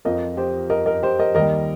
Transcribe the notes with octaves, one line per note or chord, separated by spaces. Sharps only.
F2 F3 A#4 D#5
G4 C5
A#4 D#5
A#4 D#5
G4 C5
A#4 D#5
D#2 D#3 G3 A#4 D#5